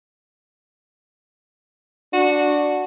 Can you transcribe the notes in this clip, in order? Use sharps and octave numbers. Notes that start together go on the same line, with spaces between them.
D4 F#4